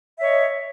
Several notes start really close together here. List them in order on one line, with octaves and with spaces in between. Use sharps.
E5 C#5 D#5